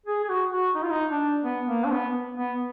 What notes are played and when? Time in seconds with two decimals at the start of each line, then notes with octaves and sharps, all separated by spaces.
0.06 G#4
0.24 G#4
0.29 F#4
0.53 F#4
0.75 D#4
0.83 F4
0.91 D#4
1.11 D4
1.45 B3
1.68 A#3
1.84 D4
1.92 B3
2.37 B3